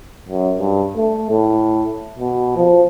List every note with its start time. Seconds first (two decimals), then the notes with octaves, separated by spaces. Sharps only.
0.29 F#2
0.59 G2
0.96 A3
1.30 A2
2.19 B2
2.57 F3